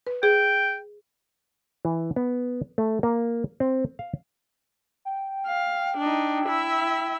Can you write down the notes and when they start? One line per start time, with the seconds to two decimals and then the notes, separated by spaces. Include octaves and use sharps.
0.07 B4
0.23 G#4 G5
1.85 E3
2.16 B3
2.78 A3
3.03 A#3
3.60 C4
3.99 F5
5.05 G5
5.47 F5
5.98 D4 D#4
6.46 E4 E5